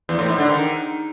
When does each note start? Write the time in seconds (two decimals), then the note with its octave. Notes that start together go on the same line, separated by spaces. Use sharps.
0.09 E2
0.19 A2
0.29 G#2
0.38 D3
0.48 D#3